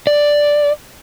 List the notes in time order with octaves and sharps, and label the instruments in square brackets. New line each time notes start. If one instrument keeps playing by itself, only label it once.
[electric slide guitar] D5